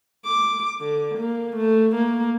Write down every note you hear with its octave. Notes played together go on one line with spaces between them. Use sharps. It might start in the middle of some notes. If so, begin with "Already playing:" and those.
D6
D3
A#3
A3
A#3